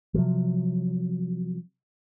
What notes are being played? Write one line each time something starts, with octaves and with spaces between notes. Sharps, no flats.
C3 F3 F#3